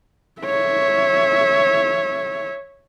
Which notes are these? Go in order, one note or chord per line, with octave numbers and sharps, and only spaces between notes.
C#5 E5